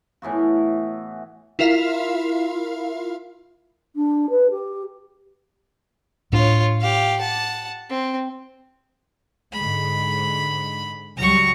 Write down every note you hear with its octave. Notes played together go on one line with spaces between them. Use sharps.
A2 E3 B3 F#4
E4 F4 A#4 E5 F5
D4
B4
G4
A2 D4 F4 C#5
G4 F5
F#5 A5
C4
G#2 D3 G#3 B5
C#2 F#3 G3 A#5 C#6